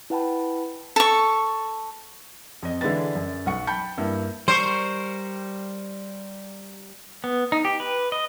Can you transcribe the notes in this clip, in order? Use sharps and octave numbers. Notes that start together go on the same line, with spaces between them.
E4 B4 F#5 G5 A5 B5
A4 C#6
F2 D#5
D3 E3 G#3 D4 B4 A6
F#2
B1 F#5 C#6 C#7
G5 A5 B5 G6 C#7
G2 A#3 E4
G3 A#4 C5 C#6
B3
D#4
G4
B4
D#5